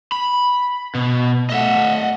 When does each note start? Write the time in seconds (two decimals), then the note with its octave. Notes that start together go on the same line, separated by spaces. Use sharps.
0.12 B5
0.95 B2
1.50 A3 D#5 E5 F#5